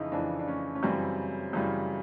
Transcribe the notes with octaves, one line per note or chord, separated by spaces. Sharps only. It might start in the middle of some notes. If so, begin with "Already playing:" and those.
Already playing: F2 C#3 E3 D#4 E4
F2 C#3 E3 D4
D4
C#4
C#4
F#2 C#3 E3 G3 C4
F#2 C#3 E3 G3